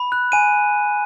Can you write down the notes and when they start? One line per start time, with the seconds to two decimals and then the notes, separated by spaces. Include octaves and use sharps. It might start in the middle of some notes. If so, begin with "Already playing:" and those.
Already playing: B5
0.12 F#6
0.32 G#5 D#7